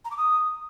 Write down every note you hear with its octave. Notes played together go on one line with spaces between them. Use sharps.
A#5
D6
D#6